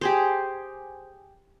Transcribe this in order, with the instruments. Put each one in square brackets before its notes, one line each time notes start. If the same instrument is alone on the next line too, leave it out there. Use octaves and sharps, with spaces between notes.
[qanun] G4 G#4 C5